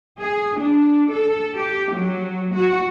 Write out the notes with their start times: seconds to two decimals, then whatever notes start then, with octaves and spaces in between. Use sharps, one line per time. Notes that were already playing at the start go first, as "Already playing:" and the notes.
0.20 G#4
0.61 D4
1.12 A4
1.56 G4
1.93 F#3
2.54 F#4